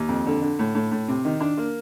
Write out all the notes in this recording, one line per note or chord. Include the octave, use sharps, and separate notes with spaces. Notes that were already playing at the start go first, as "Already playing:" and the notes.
Already playing: D#2
F2
D3
D3
A2
A2
A2
C3
D#3
D4
A#3